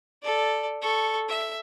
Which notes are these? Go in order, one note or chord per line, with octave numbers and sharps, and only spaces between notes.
A4 D5
A4 C#6
E5